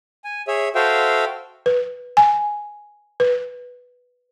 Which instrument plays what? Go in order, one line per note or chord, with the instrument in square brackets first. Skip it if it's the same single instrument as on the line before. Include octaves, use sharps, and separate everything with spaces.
[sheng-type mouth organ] G#5
G#4 C#5 E5
F#4 A4 C5 E5 F5 G5
[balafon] B4
G#5
B4